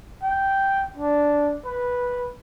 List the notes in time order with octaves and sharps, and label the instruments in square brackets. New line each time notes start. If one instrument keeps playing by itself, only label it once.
[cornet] G5
D4
B4